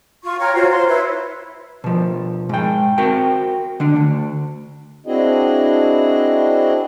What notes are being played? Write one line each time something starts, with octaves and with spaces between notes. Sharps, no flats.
F4 C#6
C#5 G5 A#5 F6
F4 F#4 C5 C#5
C5 C6
E4 B4 C#5
B2 F3
G#2 G5
C4 F#4 A#4 G5
D3 D4
D2
C4 D4 E4 F#4 G#4 D#5